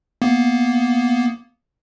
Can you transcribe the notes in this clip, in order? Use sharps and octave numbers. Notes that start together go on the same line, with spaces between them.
A#3 B3